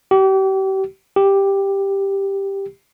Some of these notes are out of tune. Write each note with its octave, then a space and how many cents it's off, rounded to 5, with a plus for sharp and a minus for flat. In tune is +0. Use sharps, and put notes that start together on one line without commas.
G4 -35
G4 +5